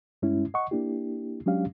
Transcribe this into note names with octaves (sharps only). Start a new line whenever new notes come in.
G2 G#3 C#4 E4
D#5 F#5 C#6
A#3 D4 E4 G4
F#3 G#3 C#4 D4 G4 F5